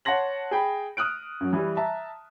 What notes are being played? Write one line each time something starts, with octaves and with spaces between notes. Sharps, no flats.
C#5 F#5 A5 C6 A#6 F#7
G#4 G5 B5
D#6 F6 F#6 D7
F#2 F#3
E3 G3
E5 A5 A#5